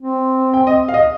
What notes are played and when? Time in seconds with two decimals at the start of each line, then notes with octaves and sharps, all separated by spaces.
0.01 C4
0.54 G5
0.67 D#5
0.88 F5
0.94 D#5